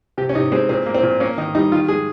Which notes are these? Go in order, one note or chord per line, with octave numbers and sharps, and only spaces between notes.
C3 G4
C#4
C3 D#4
G#3 C4
A#2 C4
A#3
C4
A#2
A#3 C#4
D#3 D#4
G3 D#4
D#3 F4
G#3 G#4